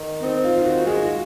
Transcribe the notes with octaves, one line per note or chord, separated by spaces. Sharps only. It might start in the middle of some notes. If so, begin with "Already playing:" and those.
Already playing: D#3
C4 D#4
F4
D#3 F4
F#4
G#3 F4
F#4